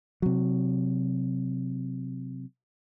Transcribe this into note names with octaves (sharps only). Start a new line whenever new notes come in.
C3 F#3